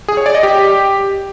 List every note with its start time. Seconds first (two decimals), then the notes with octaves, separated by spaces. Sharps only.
0.08 G#4
0.17 C#5
0.26 D5
0.35 D#5
0.43 G4